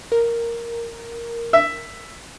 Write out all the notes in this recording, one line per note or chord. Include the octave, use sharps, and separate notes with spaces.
A#4
E5